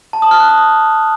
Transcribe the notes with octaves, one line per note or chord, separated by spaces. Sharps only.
A5
D#6
F6
F#6
D#6